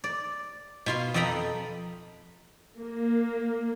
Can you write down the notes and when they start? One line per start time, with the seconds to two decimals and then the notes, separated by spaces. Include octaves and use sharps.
0.04 D5
0.86 B2 F4 C6
1.14 F2 A4 D#5 G5 A#5 B5
2.76 A#3